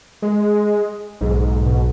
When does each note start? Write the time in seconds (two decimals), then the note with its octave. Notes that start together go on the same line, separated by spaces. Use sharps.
0.22 G#3
1.21 B1 G#2
1.65 B2